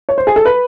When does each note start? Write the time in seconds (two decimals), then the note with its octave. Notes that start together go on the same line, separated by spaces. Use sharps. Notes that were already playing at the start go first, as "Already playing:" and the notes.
0.09 C#5
0.18 C5
0.27 G#4
0.36 A4
0.45 B4